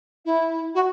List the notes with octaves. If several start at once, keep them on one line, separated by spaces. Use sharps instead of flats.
E4
F#4